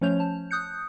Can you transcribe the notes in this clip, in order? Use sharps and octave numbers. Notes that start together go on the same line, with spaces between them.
F3 A3 C#4 C#5 G6 F7
A5
D#6 F#6 G6 C#7